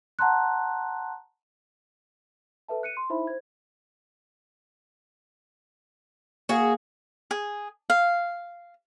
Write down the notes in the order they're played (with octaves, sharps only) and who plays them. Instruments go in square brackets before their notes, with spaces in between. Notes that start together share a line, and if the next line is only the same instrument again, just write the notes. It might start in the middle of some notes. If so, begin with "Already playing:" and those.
[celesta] F#5 A5 A#5 C6 F#6
A4 B4 E5 A5
F#6 C#7 D#7
C6
D#4 E4 C5 E5 B5
C5 G#6
[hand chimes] A#3 F5 [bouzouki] F#4 G#4
[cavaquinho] G#4
F5